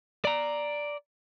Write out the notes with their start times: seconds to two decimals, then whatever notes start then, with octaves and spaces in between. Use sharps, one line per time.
0.25 D5 A#5